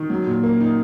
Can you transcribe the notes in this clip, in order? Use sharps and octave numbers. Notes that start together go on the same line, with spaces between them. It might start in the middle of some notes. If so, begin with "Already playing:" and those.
Already playing: D#3
F#3
A#2
A#3
D#4